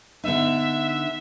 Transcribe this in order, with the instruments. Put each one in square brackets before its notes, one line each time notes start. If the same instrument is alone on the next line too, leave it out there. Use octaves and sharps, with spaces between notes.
[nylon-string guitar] D3 B3 D#4 [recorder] E5